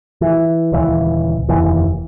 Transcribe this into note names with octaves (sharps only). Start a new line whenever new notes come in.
E3
D#1 C#2 E3
F1 D#2 E3